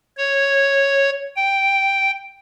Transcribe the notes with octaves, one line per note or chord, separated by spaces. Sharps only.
C#5
G5